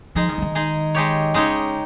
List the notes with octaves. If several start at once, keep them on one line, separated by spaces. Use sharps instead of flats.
F3 G#3 D#4 G#4
D#3
F3
D#3
G#3 D#4 G#4
G#3 D#4 G4 C#5
C#3 G#3 D#4 G4 C#5